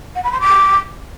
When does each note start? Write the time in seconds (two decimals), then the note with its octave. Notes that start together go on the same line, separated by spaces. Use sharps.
0.15 F#5
0.24 B5
0.32 C6
0.41 D6